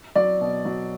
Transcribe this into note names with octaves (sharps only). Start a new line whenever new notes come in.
F#3 D5
B2
F#3